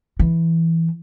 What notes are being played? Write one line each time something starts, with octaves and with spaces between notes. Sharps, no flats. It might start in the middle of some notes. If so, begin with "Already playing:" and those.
E3